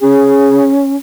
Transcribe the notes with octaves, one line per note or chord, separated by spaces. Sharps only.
C#4 G#4